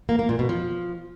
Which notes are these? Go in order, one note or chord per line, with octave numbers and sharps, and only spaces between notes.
A#3
A#3
A#2
B2
F3